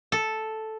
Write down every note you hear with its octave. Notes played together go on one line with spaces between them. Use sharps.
A4